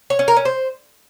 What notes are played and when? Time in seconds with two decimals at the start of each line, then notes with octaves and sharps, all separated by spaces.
0.10 C#5
0.19 C#4
0.28 A#4
0.37 C#4
0.45 C5